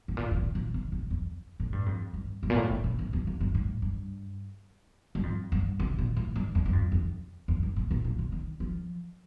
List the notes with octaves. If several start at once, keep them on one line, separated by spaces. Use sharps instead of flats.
A2
A#2
G2
A2
A#2
C3
A2
F2
A2
G2
F2
G2
G2
A#2
A2
A#2
A#2
A2
F2
F2
G2
A2
G2
G2
F2
G2
C3
A#2
A2
G2
F2
G2
F2
F2
F2
G2
A2
A#2
A#2
C3
D#3
F3